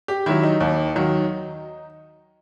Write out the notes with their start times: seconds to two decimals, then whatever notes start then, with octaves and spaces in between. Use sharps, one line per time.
0.08 G4
0.26 D#3 F#3 E4
0.43 D#4
0.60 D#2
0.96 D#3 F#3